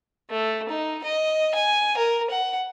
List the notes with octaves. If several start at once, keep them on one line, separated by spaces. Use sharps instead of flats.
A3
D#4
D#5
G#5
A#4
F#5